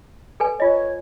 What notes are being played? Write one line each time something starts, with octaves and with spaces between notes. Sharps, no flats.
A4 B4 G#5
F4 C#5 D#5